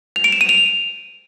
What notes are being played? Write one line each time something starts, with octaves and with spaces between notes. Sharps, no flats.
F7
D7
E7
D#7
F7